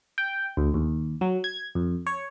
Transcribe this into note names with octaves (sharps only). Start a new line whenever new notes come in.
G5
D2
D#2
F#3
G#6
F2
C#5